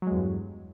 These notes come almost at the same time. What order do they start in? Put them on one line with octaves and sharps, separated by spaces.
F#3 G#3 E2 G2